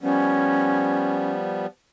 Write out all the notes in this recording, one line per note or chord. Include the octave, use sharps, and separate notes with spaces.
F3 G3 B3 C#4